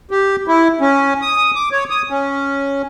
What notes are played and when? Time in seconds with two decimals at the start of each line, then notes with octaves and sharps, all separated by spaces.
0.11 G4
0.48 E4
0.81 C#4
1.22 D#6
1.55 D6
1.72 C#5
1.90 D#6
2.10 C#4